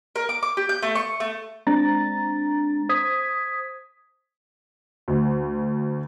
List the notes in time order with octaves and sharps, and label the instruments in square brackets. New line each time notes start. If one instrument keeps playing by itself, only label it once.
[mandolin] A#4
D6
D6
G4
G6
A3
C#6
A3
[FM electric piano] G#3 C4 D4 A#5 A6
C5 D#6 G#6 B6
[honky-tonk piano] D2